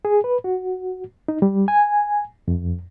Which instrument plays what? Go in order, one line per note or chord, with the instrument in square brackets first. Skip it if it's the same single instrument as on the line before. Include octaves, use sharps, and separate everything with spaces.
[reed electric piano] G#4
B4
F#4
D#4
G3
G#5
F2